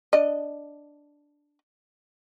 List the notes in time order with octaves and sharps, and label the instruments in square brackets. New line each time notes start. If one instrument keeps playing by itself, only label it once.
[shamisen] D4 D#5